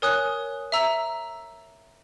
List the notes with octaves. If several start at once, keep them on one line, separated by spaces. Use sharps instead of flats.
A#4 C#5 G#5 D#6 F#6
E5 A#5 E6